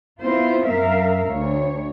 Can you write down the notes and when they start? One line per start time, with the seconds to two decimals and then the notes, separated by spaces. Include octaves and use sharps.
0.21 B3 C4 E4 F4 C5
0.66 F#2 A#4 E5 F5
1.28 D2 C#5